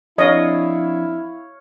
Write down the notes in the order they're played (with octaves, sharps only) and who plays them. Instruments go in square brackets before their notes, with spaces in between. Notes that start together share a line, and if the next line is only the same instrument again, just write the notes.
[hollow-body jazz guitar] F2 D4 [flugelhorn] E4 [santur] C#5 F5 [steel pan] D#5